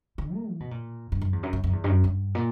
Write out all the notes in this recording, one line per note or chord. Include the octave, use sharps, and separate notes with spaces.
D3
A#3
E3
B2
A#2
G2
F#2
E2
F#2
G2
F#2
E2
G2
F#2
G2
A#2